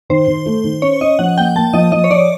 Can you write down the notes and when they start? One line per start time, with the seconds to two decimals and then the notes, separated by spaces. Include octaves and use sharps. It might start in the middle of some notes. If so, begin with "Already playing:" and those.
0.10 D#3 C5
0.27 D#3
0.46 A3
0.64 D#3
0.82 C#4 C#5
1.01 C#4 D#5
1.19 F3 F#5
1.37 A#3 G5
1.56 A#3 A5
1.73 F3 D#5
1.92 F3 D#5
2.04 C#5
2.10 F3 D5